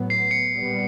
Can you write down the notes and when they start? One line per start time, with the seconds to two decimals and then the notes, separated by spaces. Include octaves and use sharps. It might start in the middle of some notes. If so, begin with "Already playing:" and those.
Already playing: A2 F#3 B3
0.10 C7
0.31 C#7
0.52 A#2 G3 B3